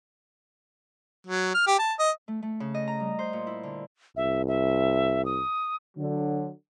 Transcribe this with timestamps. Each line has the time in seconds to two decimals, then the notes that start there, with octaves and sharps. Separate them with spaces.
1.27 F#3
1.54 F6
1.67 G4
1.79 A5
1.99 D#5
2.28 A3
2.42 A3
2.60 C#3
2.74 D#5
2.88 A#5
3.00 G3
3.19 C5
3.33 A#2
3.47 E4
3.63 D3
4.16 C2 E5
4.48 E5
5.25 D#6
5.98 D3 F#3